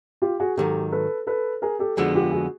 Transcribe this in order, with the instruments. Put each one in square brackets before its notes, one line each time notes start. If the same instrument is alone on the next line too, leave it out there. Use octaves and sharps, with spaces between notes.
[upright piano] F4 G4
F#4 G#4
[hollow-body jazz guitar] G#2 D#3 F#3 [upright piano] G4 A4
[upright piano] A4 B4
A4 B4
G#4 A#4
G4 A4
[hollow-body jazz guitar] F2 D3 F3 G#3 B3 [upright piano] F#4 G#4
[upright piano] F4 G4
F#4 G#4